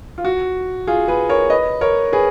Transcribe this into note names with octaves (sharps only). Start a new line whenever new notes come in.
F4
F#4
F4 G#4
G#4 B4
A#4 C#5
B4 D#5
A#4 C#5
G#4 B4